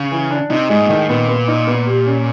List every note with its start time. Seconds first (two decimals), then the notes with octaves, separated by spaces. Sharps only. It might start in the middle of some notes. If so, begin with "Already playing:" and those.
Already playing: C#3
0.11 E3
0.31 D4
0.50 C3 D#4
0.70 G#2 G#3
0.82 A#2
0.89 A2 D#3
1.09 A#2 B3
1.29 B3
1.48 D#4
1.67 B3
1.87 G4
2.06 C#4